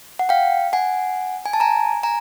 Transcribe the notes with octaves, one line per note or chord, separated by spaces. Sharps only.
F#5
F5 G5
F#5 G#5
G#5
A5
G#5 A#5
G#5 A#5